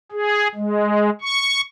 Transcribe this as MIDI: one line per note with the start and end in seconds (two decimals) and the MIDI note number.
0.12 0.48 68
0.55 1.10 56
1.21 1.61 85